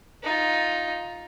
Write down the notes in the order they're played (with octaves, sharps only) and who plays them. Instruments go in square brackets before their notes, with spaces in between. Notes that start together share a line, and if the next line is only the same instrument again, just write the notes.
[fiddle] D#4 F4